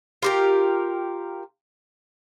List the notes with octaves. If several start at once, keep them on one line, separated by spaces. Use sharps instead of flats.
F4 G4 A#4